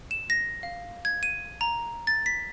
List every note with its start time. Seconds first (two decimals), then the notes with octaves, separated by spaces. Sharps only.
0.11 E7
0.30 A#6
0.63 F5
1.05 G#6
1.23 D#7
1.61 A#5
2.07 A6
2.26 B6